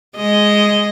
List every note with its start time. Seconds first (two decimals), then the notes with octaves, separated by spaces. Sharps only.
0.16 G#3 D#5